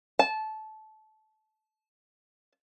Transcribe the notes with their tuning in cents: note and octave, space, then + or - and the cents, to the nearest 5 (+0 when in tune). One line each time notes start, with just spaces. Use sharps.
A5 -20